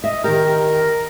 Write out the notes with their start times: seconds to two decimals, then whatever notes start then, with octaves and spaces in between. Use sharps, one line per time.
0.04 D#5 E5
0.24 D#3 G4 A#4